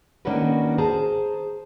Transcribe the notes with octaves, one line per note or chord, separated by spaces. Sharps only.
D#3 A#3 C#4 D4 F#4 B4
G#4 C5 A5 A#5